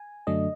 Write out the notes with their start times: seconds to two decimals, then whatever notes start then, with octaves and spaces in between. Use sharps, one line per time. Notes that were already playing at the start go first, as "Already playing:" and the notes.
Already playing: G#5
0.27 F#2 D3 F#3 A3 D4 D#5